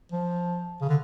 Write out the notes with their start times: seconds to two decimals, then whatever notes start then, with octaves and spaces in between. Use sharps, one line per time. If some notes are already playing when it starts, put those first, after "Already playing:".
0.12 F3
0.81 C#3
0.89 D3